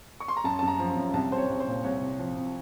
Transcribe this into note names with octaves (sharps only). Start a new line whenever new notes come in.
C#6
C6
A#5
F#2 A5
F#2 A5
A#5
F3
F#2
C2 A5
C2 C5
C#5
C2
C5
A#2
C2 C#5
C3
F3
C3